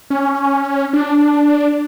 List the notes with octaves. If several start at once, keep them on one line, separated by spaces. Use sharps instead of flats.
C#4
D4